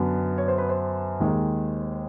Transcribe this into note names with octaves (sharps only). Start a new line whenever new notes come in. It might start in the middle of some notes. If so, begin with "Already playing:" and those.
Already playing: F#2 D3 F#3 B3
C#5
C5
B4
C5
D#2 D#3 G#3